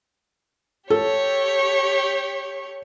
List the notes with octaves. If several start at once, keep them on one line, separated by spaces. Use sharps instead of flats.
G4 A4 C#5